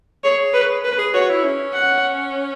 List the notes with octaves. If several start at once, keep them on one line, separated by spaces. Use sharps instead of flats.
G#4 C#5
B4
B4
G#4
F#4 C#5
E4
C#4
F#5